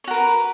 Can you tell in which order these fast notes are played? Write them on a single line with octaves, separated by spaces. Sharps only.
C#5 F#4 A#4 B4